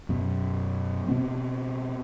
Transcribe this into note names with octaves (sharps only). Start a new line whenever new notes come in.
F#2 B2
B2 B3 C4